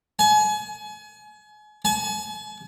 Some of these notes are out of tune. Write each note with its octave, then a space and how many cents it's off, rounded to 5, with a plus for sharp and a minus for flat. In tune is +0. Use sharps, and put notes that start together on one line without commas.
G#5 +35
G#5 +45